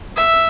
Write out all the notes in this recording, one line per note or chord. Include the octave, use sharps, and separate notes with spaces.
E5